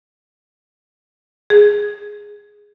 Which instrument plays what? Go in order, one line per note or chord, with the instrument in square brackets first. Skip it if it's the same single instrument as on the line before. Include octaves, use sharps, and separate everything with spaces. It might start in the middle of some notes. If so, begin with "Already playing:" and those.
[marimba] G#4